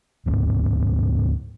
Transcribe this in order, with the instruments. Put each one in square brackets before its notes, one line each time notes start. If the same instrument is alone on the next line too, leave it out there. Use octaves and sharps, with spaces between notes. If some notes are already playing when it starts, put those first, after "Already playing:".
[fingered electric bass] G1 D2 G#2